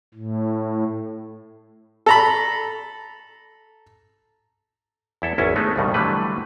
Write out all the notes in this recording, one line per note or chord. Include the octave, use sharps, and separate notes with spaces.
A2
A4 A#5 B5
E2 E4 A4
G#1 E2 C#4 E4
G#3 A3 B3 D#4
C2 G2 B2 D#3
D3 E3 F#3 G3 A3 B4